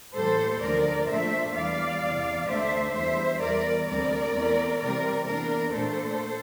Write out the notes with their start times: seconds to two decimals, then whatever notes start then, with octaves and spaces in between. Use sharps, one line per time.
0.14 A2 E3 G3 A#3 A4 C5
0.61 D2 D3 F3 A#4 D5
1.07 A#2 F3 A3 D4 C5 E5
1.54 E2 E3 G3 D5 F5
2.01 E2 C3 E3
2.47 D2 D3 A3 D4 C5 E5
2.93 E2 E3 G3 C5 E5
3.40 E2 E3 G3 A#4 D5
3.87 D2 D3 G3 C4 A#4 D5
4.33 E2 E3 A3 C4
4.79 C3 E3 G3 C4 A#4 D5
5.25 E2 E3 A#3 D4 A#4 D5
5.72 A#2 A3 D4 A4 C5